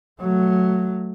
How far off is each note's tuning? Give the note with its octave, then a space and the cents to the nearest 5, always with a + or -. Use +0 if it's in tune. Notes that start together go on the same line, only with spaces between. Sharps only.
F#3 +0 A3 +0